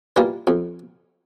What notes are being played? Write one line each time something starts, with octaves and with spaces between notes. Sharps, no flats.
E3 G3 A#3 F4
F2